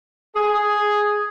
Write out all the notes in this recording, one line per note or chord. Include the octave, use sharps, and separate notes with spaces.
G#4